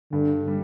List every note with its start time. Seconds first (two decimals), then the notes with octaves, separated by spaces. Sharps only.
0.12 G2 D3
0.48 G3